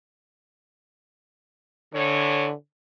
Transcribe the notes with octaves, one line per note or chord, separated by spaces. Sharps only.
A2 D3 E3 C#5